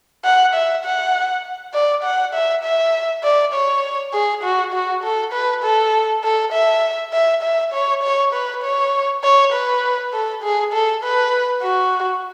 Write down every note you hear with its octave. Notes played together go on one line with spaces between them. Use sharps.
F#5
E5
F#5
D5
F#5
E5
E5
D5
C#5
G#4
F#4
F#4
A4
B4
A4
A4
E5
E5
E5
C#5
C#5
B4
C#5
C#5
B4
A4
G#4
A4
B4
F#4